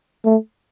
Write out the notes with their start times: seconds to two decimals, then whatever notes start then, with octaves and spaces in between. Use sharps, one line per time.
0.25 A3